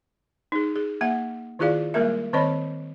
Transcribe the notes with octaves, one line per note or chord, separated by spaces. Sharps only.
D#4 G#4
G#4
A#3 E5 F#5
D#3 E4 F4 G#4 D5 F5
G3 G#3 A#3 A#4 E5
D#3 C4 C#5 D#5 B5